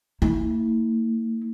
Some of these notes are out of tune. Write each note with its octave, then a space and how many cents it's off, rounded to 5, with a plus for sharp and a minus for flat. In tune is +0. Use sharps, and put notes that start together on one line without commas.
A#3 -45 E4 -35